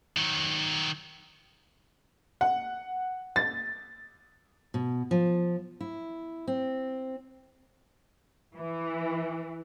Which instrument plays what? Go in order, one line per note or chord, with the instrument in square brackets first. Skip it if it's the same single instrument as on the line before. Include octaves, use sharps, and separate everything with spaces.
[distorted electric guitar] D#3 F#3
[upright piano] F#5
A6
[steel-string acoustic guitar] B2
F3
E4
C4
[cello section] E3